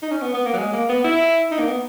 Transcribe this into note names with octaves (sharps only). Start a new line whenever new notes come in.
D#4
C#4
B3
B3
A#3
F#3
G#3
A#3
B3
E4
D#4
A#3
B3